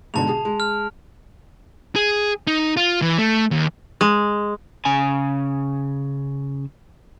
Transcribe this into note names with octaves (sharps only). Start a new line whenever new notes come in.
G#2 B2 D3 A5 F7
G#4
G#3
F6
G#4
D#4
F4
E3
A3
D#2
G#3
C#3 G#5